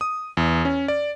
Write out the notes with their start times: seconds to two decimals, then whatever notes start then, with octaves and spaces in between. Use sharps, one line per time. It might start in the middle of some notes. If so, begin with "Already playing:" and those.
0.01 D#6
0.37 E2
0.65 C#4
0.88 D5